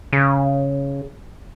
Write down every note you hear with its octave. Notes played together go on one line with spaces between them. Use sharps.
C#3